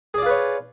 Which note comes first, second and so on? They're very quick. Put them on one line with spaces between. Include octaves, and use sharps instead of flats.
G#4 D5 F4 B4 C#5